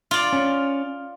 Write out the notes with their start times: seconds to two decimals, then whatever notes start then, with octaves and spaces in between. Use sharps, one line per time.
0.11 F4 D5
0.33 C#4